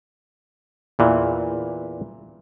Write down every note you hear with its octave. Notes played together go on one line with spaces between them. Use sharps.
E2 A#2 E3